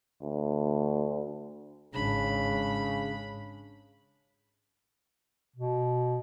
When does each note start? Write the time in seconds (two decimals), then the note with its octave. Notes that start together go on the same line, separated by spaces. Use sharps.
0.22 D2
1.94 G#1 C#3 D4 B5
5.56 B2